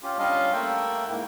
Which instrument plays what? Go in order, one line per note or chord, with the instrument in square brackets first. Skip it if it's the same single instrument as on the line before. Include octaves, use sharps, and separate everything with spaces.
[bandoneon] C#4 F4 G4
G3 C#4 D4 F4 D#5 F5
A3 A#3 E5 F#5 G5
G#2 A#3 E4